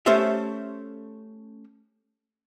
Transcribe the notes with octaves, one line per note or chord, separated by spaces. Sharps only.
A3 C#4 G4 A4 C5 E5